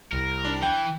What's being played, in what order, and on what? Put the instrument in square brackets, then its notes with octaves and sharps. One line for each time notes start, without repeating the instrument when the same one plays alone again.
[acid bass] C2 [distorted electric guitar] A#4
[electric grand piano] D4
[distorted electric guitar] E3 [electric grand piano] G5